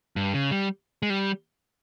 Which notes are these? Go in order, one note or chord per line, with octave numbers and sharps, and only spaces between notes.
G2
C#3
G3
G#3
G3